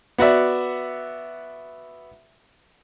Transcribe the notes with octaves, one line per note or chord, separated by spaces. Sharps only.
B3 F#4 D5 E5